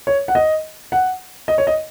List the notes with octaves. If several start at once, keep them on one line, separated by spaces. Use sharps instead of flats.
C#5
F#5
D#5
F#5
D#5
C#5
D#5